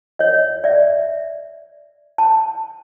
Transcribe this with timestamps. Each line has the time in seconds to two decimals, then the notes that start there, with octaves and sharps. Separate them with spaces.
0.19 C#5 D#5
0.64 D5 E5
2.18 A5